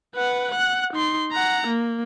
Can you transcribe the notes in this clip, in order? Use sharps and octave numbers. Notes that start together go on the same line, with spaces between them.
B4 F#5
F#5 F#6
D#4 C6
F#5 A#5
A#3